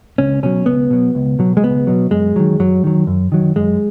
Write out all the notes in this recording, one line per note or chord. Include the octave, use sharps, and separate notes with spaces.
C#2 C#4
B2 F#3 C#4
C#2 B3
B2 F#3
C#2
B2 F#3
G#3
C#2 B3
B2 F#3
F#2 G#3
D#3 F#3
F#2 F#3
D#3 F#3
F#2
D#3 F#3
F#2 G#3